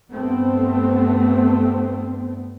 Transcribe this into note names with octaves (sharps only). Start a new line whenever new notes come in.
G2 A3 B3 C4